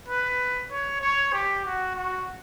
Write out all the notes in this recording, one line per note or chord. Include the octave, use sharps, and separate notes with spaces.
B4
C#5
C#5
G4
F#4
F#4